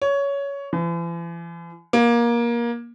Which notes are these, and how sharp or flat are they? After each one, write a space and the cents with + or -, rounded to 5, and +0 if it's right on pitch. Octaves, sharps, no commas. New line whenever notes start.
C#5 +15
E3 +45
A#3 +20